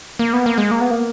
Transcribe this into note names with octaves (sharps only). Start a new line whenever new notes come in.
A#3
B3
A#3
G#3
A#3
B3
A#3